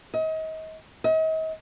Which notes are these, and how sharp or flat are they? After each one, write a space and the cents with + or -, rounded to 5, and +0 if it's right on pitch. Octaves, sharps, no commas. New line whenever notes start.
D#5 +35
D#5 +40